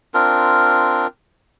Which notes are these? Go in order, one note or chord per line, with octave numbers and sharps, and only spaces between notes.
C4 D4 F4 A#4